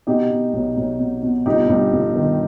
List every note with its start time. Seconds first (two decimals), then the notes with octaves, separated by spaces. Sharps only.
0.07 B2 D#4 G4
0.31 B2
0.53 B1
0.77 B1
1.00 B2
1.23 B2
1.46 G1 D#4 G4
1.69 G2
1.92 G1
2.15 D#3